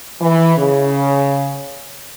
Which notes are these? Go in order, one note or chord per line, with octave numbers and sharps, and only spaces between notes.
E3
C#3